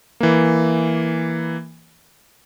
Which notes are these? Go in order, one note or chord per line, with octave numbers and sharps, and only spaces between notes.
E3 A#3